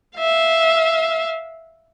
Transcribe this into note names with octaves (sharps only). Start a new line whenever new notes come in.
E5 F5